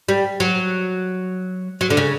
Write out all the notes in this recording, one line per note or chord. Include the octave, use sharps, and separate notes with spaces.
G3
F#3
F#3
D3
C#3